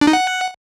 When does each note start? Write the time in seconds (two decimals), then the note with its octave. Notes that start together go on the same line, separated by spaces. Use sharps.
0.01 D4
0.07 D#4
0.13 F#5